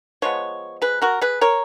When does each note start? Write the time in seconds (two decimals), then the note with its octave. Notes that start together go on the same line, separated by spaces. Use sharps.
0.22 F3 G#3 B3 C#5
0.82 G#4 B4
1.02 F#4 A#4
1.21 G#4 B4
1.41 A#4 C#5